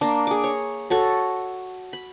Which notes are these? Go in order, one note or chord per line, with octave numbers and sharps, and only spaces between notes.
A#3 D4
G#4 D6
C#5
F#4 A4 C#5
B5